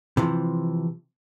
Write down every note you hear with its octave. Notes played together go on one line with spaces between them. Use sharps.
C3 E3 F3